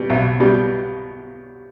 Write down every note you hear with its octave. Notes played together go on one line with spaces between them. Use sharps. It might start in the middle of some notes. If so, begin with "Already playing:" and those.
Already playing: B2 G3
B1
B2 G3